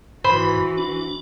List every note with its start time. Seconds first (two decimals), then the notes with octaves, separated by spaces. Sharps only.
0.24 G#2 E3 F#4 B4 C5 B5
0.77 D4